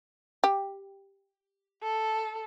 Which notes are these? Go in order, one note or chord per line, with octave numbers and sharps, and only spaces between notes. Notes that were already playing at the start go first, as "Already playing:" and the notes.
G4
A4